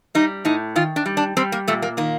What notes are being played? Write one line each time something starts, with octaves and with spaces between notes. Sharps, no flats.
G3 D#4
A2 D#4
D#3 F4
D4
G3
D4
G3 C4
A#3
A#2 A3
A#3
D#3 A#3